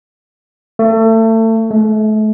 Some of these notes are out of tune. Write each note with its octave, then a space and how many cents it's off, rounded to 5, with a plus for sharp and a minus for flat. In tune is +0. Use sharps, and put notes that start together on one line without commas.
A3 +30
A3 -35